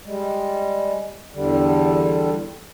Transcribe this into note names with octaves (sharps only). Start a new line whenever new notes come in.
G3 G#3
E2 D3 G3